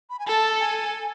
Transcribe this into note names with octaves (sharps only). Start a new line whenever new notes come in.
B5
G#5
A4 A5
G#5